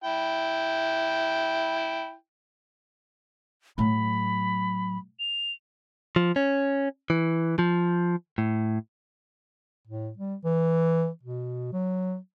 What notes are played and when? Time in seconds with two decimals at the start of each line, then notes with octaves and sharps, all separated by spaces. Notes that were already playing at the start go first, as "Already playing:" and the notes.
0.04 E4 G5
3.78 A2 F#3 B5
5.19 F7
6.16 F3
6.36 C#4
7.10 E3
7.59 F3
8.38 A2
9.88 A2
10.18 G3
10.45 E3
11.23 B2
11.73 F#3